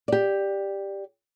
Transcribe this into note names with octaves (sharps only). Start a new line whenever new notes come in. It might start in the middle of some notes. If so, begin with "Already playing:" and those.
G4 D5